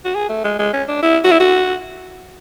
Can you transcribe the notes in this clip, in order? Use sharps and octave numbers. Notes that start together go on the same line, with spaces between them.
F#4
G#4
A3
G#3
G#3
C#4
D4
E4
F#4
E4
F#4